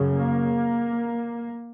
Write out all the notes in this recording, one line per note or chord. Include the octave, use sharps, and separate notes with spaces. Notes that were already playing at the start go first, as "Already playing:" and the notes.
Already playing: F#2 C#3
A#3